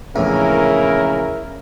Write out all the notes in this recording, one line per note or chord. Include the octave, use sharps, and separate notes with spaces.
A#1 E2 A2 C#3 E4 A#4